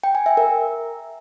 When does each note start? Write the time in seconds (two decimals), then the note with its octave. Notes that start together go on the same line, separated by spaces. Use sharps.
0.04 G5
0.15 G#5
0.26 E5
0.37 A#4